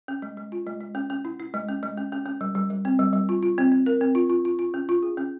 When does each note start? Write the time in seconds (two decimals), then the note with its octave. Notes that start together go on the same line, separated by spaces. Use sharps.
0.08 C#4
0.22 G#3
0.37 G#3
0.52 F4
0.67 G#3
0.81 G#3
0.95 C#4
1.10 C#4
1.25 E4
1.39 E4
1.54 G#3
1.68 C#4
1.83 G#3
1.98 C#4
2.12 C#4
2.26 C#4
2.41 G3
2.55 G3
2.70 G3
2.85 C4
2.99 G3
3.13 G3
3.29 F4
3.43 F4
3.58 C4
3.72 C4
3.86 A#4
4.01 C4
4.15 F4
4.30 F4
4.45 F4
4.59 F4
4.74 C#4
4.89 F4
5.03 G#4
5.17 C#4